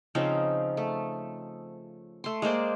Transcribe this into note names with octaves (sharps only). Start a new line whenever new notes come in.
C#3 F3 C4 D#4
A3
A3 C6
G#3 A#3 C5 D5